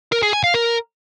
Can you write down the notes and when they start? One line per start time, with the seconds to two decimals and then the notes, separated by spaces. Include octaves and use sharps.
0.12 A#4
0.23 G#4
0.33 G#5
0.44 F5
0.54 A#4